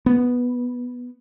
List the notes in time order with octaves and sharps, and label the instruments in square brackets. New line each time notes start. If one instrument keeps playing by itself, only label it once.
[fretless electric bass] B3